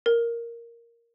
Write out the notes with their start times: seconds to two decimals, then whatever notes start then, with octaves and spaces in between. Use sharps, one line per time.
0.06 A#4